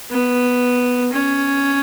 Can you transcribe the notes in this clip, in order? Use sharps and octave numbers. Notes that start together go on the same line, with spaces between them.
B3
C#4